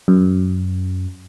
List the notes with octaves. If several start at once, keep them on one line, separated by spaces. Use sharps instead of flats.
F#2